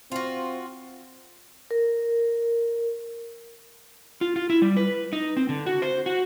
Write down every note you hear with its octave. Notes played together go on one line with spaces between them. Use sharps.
C4 F4 F#4
A#4
F4
F4
E4
G3
B4
D#4
C4
D3
F#4
C5
F#4